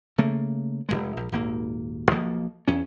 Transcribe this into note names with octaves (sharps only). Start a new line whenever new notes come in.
C#3 A3 A#3
F1 C#2 G#3
A#1
D#1 G#1 A#3
B1 F3 A#3
E2 C#4